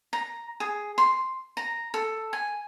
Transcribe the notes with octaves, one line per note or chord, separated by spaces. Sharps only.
A#5
G#4
C6
A#5
A4
G#5